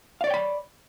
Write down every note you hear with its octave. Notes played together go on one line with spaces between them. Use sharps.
C#5 D5 F5 G5 B5